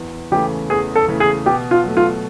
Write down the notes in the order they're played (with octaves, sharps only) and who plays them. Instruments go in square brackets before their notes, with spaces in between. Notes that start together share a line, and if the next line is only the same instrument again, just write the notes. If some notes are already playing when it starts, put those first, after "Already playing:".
Already playing: [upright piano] E2
[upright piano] C#3 E3 A3 [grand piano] G4
[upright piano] E2 [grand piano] G#4
[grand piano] A4
[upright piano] C#3 E3 A3
[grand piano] G#4
[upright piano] B2 [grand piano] G4
[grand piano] F4
[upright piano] F#3 A3
[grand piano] F4